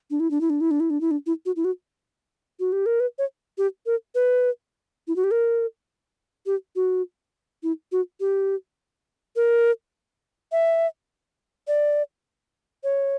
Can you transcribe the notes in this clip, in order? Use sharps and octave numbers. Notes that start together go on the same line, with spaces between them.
D4
E4
D4
E4
D4
E4
D4
E4
D4
E4
D4
E4
F#4
E4
F#4
F#4
G4
A#4
B4
C#5
G4
A#4
B4
E4
F#4
G4
A#4
G4
F#4
E4
F#4
G4
A#4
E5
D5
C#5